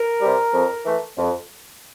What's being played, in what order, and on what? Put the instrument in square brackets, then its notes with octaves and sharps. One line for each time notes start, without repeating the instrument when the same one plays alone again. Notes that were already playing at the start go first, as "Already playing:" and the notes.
Already playing: [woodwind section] A#4
C3 G3
F2
E3 A3
F2